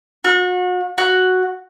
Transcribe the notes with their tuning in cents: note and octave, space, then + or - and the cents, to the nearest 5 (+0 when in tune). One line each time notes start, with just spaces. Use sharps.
F#4 -35
F#4 +0